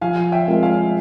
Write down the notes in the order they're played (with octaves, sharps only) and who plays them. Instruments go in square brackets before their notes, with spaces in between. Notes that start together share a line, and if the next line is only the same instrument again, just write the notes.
[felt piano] F3 [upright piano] F5 G#5
[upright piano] E5 G5
[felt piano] G#3 C4 F4 A#4
[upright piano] F5 G#5